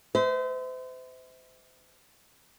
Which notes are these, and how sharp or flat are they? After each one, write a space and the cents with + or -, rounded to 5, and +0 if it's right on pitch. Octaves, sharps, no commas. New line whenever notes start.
C5 -40 E5 -35